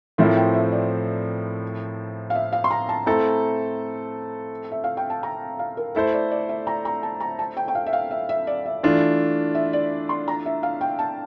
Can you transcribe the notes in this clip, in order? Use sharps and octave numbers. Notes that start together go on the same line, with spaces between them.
A2 F3 C4 E4 A#4 E5
G5
E5
D5
F5
E5
F5
C6
A#5
A5
A3 C4 E4 A4 A#5
E5
F5
G5
A5
A#5
F5
A#4
A3 E4 A4 C5
D5
D5
E5
A#5
A#5
A5
A#5
A5
G5
G5
F5
E5
F5
E5
E5
D5
E5
E3 A3 D4 F4
E5
D5
C6
A#5
E5
F5
G5
A5